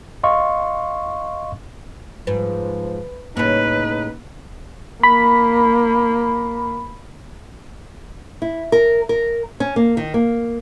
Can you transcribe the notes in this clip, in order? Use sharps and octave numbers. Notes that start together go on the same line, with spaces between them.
D#5 F5 C6 C#6
G#2 F3 B4
A2 C#3 A#3 D#4 B4
A#3 B5
E4
A#4
A#4
C#4
A#3
D#3
A#3